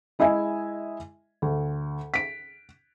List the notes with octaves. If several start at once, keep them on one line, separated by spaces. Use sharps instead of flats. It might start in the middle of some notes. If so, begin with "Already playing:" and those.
G#3 E4 D#5 E5 G#5
D2
B6 D7